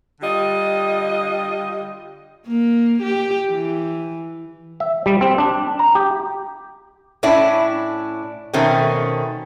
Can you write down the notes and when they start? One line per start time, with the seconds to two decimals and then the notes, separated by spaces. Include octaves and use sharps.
0.21 D3 G3 F4 D#5
2.47 A#3
3.02 G4
3.49 E3
4.80 E5
5.06 G3
5.21 C4
5.38 D4
5.79 A#5
5.95 G4
7.23 A2 C#4 D4 E4
8.53 B2 D#3 A3 C4 C#4